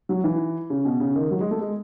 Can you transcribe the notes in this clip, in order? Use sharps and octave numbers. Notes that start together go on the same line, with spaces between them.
F#3
E3
C#3
B2
C#3
D#3
F#3
G#3
A3
G#3